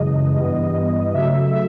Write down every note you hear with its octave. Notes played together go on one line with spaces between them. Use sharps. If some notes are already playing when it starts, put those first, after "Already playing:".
Already playing: F#2 C#3 E3 G#3 D#5
G2 E3 G3 B3
C#3 F#3 A3 E5
E5